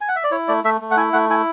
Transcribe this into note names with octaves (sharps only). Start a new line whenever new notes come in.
G#5
F#5
E5
D5
E4 C#5
A3 D5
A3 E5
A3
F#5
E4 G#5
A3 F#5
E4 G#5